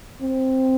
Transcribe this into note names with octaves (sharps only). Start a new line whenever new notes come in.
C4